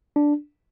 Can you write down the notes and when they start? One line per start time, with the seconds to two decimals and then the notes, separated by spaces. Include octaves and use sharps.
0.16 D4